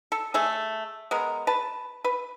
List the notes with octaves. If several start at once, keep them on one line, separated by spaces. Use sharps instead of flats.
A4
A3 G#4 A4
G#3 B3 A#4
B4 A5
B4